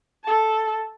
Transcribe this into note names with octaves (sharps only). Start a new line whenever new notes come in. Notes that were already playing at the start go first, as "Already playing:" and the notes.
A4 A5